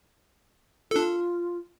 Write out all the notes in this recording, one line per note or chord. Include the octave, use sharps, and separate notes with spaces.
D4 F4 A4